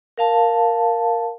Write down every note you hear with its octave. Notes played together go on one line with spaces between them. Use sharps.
A#4 F5 A5